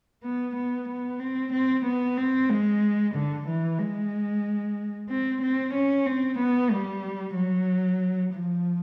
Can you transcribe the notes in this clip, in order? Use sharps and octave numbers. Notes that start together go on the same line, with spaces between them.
B3
B3
B3
C4
C4
B3
C4
G#3
D3
E3
G#3
C4
C4
C#4
C4
B3
G3
F#3
F3